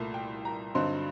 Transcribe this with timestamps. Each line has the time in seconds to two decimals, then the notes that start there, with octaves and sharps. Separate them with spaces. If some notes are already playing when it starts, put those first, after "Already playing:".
Already playing: C2 A#2 A3
0.14 G5
0.45 A#5
0.75 G2 D3 F#3 C4 D#4 C6